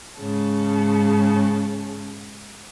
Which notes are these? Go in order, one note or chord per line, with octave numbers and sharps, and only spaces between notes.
G#2 C#3 C#4 A5